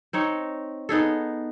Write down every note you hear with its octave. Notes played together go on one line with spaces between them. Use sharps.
C4 D#4 C#5
B3 D#4 G#4 A4